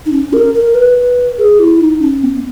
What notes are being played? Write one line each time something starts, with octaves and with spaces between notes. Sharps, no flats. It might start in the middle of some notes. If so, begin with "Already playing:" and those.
D#4
C#4
A#4
A#4
B4
G#4
E4
D#4
C#4
B3